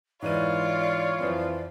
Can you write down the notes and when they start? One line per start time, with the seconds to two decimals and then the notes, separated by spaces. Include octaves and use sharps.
0.22 G#2 E3 F4 C#5 D5 D#7
1.19 F2 E3 F3